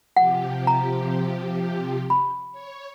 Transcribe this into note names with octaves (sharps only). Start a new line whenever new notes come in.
C3 F3 G4 F#5
A#5
B5
C#5